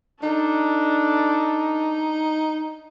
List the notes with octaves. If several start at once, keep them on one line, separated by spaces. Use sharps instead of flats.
D4 D#4 A4